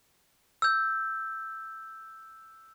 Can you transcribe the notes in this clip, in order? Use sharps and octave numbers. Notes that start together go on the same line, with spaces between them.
E6 G6